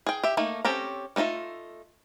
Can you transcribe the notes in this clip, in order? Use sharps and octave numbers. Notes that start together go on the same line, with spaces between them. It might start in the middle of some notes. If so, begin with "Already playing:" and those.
G#4 G5
G4 E5
A3 A#3 D#4
C4 C#4 G4 A4 A#5
A3 A#3 D#4 F4 E5